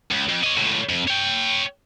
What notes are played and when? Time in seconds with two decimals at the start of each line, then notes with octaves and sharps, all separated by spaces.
0.11 C#2
0.29 F2
0.43 C#5 D#5
0.57 C#2 A2
0.89 F2
1.08 C#5 G5